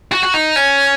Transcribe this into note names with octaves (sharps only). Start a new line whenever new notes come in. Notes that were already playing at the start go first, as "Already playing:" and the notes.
F#4
F#4
D#4
C#4